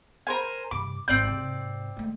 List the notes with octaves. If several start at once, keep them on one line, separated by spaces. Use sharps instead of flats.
A#4 C5 G#5
G2 C3 D6
G#1 G3 C4 D5 G6
G#2 C3
G#3 A3